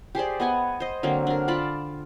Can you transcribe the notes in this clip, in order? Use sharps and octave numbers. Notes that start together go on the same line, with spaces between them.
G4 G#4 C5 D5
B3 D#5 F#5 G#5
C5 D#5
D3 F#3 A#3 C4
D4 A#4
F4 D5 A5 B5